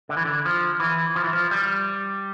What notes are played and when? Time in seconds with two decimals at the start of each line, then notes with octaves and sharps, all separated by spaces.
0.09 D3
0.17 E3
0.25 D3
0.45 F3
0.80 E3
1.16 F3
1.24 E3
1.33 F3
1.51 G3